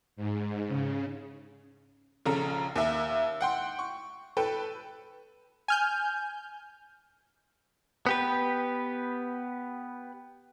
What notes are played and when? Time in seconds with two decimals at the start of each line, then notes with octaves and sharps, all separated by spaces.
0.16 G#2
0.68 C#3
2.26 A#1 C#3 A4 A#5
2.76 D#2 E5
3.41 F#5 G5 C6
3.79 C#6
4.37 A4 B4 G5
5.68 G#5 F6 G6
8.06 B3 G4 B4